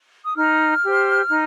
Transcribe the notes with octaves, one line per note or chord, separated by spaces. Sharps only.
D#6
D#4 F6
G4 C5
D#4